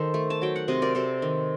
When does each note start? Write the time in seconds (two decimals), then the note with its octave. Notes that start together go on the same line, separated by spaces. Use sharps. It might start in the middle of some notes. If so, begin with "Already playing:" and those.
Already playing: D#3 D#4 A4 C5
0.14 A3
0.30 A5
0.41 F#3 G5
0.56 F#5
0.68 C3 C5 D#5
0.82 A#4 D5
0.95 C3 A4 C5
1.22 D#3